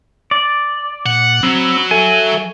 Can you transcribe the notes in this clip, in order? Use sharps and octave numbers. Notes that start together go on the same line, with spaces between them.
D5
A#2 F#5
F#3 C4 B5 E6
A4 E5 G#5